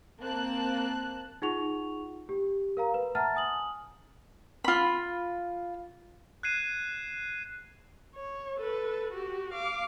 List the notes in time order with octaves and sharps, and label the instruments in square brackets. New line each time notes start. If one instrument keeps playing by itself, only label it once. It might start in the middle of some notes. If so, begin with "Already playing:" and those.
[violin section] A#3 C4 A5 F#6
[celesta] D#4 F4 G#4 F#5 C#6 F7
G4
A#4 F5 A#5
B4
E5 F#5 A5 A#5 F6 A6
G#5 D#6 F#7
[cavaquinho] F4 B5
[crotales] F#6 G#6 C7 D#7 E7
[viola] C#5
A4 B4
F#4 G4
F5 D6